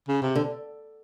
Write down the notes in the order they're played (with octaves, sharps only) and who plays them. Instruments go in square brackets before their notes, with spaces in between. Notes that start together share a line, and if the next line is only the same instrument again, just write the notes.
[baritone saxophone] C#3
C3
[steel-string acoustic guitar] D3